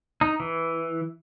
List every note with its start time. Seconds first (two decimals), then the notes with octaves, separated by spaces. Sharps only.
0.21 D#4
0.40 E3